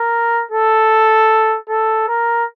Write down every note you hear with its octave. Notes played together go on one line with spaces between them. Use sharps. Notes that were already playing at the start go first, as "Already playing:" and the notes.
Already playing: A#4
A4
A4
A#4